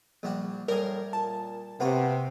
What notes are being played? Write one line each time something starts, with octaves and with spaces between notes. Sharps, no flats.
A#1 G3 F#4
A2 G3 G#4 A#4
A#2 A5
C3 A#3 B3 F4 F#4